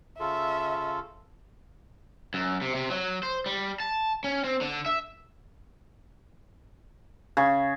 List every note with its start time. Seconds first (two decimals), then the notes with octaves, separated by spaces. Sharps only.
0.20 C#3 F4 A4 E5
2.34 F#2
2.62 C3
2.75 C3
2.91 F#3
3.23 C5
3.46 G3
3.80 A5
4.24 C#4
4.44 C4
4.61 D3
4.86 E5
7.37 C#3